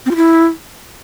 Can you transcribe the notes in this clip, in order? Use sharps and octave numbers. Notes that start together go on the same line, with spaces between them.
C4
F4
E4